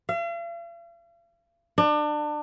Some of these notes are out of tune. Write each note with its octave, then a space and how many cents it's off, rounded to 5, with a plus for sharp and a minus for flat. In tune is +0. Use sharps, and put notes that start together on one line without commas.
F5 -45
D4 +30